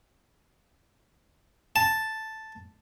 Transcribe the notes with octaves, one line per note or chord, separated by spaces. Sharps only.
A5